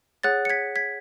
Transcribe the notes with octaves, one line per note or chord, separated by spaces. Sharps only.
G#4 C#5 F#5 F#6 A6
C#7
G#6 B6
G#6 B6